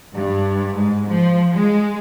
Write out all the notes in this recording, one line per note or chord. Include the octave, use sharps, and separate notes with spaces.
G2
G#2
F3
G#3